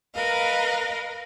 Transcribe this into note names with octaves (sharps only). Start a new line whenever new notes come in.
A#4 B4 D#5 F5